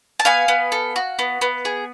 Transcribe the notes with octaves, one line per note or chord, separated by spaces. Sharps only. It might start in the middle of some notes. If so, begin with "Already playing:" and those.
A5
B3 F5 G#5
B3
A4
F#4
B3
B3
G#4